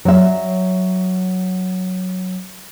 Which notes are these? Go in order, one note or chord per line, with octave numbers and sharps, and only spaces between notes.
F#3 E5